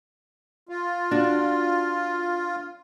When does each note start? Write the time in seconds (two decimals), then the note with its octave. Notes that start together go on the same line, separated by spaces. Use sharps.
0.69 F4
1.11 D4 F#4